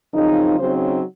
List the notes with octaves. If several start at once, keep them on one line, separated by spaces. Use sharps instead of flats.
F#2 C#3 F3 C4 D#4
C#3 F#3 C4 D#4 C5